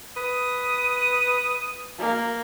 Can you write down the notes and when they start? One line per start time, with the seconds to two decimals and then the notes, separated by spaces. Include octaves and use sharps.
0.17 B4 D#6
1.99 A#3